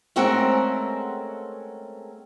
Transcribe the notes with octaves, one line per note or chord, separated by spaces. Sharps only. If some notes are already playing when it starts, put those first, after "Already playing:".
G#3 A3 C4 C#4 A#4 F#5